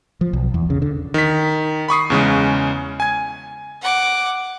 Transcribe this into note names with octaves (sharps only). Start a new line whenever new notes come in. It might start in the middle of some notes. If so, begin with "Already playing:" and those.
F3
B1
E2
C#3
D3
D#3 B6
B5 C#6 D#6 C7
E2 C#3 G#3
G#5 G#6
F#5 D6